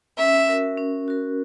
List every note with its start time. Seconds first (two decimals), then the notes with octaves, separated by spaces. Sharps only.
0.18 C#4 E5
0.48 F#4 A#4
0.78 C#4
1.08 F#4 A#4